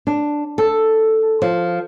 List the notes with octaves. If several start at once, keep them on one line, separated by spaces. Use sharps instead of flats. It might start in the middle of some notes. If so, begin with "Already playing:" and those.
D4
A4
F3